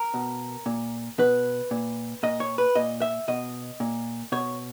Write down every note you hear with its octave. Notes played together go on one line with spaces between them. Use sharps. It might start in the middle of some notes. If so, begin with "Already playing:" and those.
Already playing: A#4
B2
A#2
B2 B4
A#2
A#2 D#5
C#5
B4
A#2 D#5
E5
B2 D#5
A#2
B2 C#5